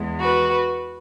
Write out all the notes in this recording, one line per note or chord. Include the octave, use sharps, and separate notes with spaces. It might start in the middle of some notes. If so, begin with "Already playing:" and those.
Already playing: E2 E3 G#3
F#4 B4